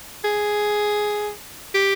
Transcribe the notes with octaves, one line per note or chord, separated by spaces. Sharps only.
G#4
G4